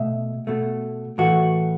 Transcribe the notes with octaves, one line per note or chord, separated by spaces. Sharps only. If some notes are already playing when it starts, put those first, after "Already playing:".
Already playing: B2 A3 E5
B2 A3
A2 E3 A3 F#4